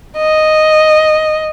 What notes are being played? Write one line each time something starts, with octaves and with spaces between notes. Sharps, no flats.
D#5